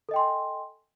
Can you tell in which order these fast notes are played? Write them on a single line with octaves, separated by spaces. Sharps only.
A4 D#5 G5 C6 G#5